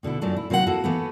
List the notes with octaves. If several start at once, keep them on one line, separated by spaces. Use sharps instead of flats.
B2 D3 B3 E4
F#2 A#2 F#3 A3 D4 F#4
E4
C3 F#3 A#3 A#4 F#5
A#3 E4 F#4 A4
E3 A3 B3